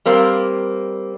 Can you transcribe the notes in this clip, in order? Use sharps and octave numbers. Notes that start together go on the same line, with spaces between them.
G3 A#3 C4